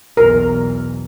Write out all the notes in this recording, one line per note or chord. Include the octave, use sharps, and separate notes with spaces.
B1 E2 A#4